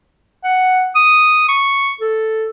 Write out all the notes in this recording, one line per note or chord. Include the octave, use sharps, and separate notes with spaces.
F#5
D#6
C#6
A4